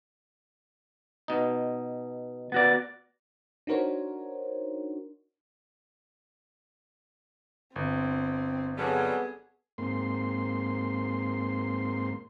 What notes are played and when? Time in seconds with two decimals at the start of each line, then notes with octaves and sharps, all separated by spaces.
1.28 B2 D#4
2.52 B3 F#4 D5
3.67 D4 D#4 F#4 A#4 C5 C#5
7.76 G1 C4
8.78 F#3 G3 B3 G#4 A4
9.78 G#2 A#3 C4 C6